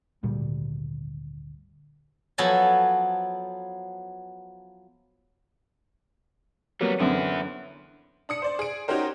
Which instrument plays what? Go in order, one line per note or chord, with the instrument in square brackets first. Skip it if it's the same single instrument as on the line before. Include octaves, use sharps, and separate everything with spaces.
[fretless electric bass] G#1 D2 A#2 G3
[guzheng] F3 F#3 B3 A4 G#5
[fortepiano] F#3 A#3 [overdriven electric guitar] G3 B3
[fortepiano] F#2 D3 C4 [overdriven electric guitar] B3 E4
[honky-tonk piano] D4 D#6 C#7
C5 D5
G#4 D7
C#4 D#4 F#4 G4 A#4 C5